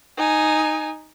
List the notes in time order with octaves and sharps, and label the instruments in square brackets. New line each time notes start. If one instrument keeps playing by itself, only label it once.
[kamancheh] D#4 G#5